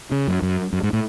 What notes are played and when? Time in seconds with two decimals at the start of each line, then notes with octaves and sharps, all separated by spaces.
0.12 C#3
0.28 F#2
0.42 F#2
0.73 F#2
0.83 G#2
0.93 A2